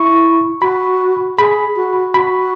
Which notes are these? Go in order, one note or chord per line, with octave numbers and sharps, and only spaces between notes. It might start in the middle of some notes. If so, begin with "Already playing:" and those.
Already playing: E4 C#6
F#4 B5
G#4 B5
F#4
F#4 B5